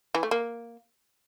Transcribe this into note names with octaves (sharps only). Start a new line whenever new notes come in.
E3
A3
A#3